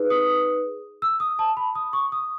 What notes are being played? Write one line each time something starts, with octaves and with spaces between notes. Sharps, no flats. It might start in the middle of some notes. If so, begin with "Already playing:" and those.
Already playing: D#4 G#4 B4
D#6
E6
D#6
A5
B5
D#6
C#6
D#6